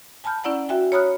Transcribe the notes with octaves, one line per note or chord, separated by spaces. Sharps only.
G#5 A5 B5 F6 G6
C#4 E4 D5 F#5 A#5
F#4 E5 G5 G#5
C#5 A#5 B5 D#6 F6 F#6